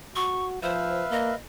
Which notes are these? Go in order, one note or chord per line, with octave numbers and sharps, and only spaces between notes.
F#4 C#6
F3 B4 C5 E5 F5
A#3 D#5